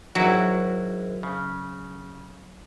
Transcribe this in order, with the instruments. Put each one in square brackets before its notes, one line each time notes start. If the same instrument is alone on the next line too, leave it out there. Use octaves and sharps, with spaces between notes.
[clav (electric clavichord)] G#1 E4 F#4 [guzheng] F#3
[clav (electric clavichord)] C#3